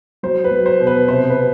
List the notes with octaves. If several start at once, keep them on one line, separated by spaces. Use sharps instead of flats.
F#3 C5
B4
F#3
C5
B2
B4
C3 C5
B4
C3